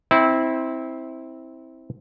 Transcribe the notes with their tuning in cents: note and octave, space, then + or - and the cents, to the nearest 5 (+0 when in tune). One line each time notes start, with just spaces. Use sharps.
C4 +5 E4 -20